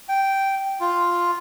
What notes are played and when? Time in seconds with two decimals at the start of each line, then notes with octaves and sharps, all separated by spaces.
0.09 G5
0.80 F4